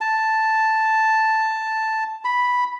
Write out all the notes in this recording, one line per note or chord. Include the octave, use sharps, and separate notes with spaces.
A5
B5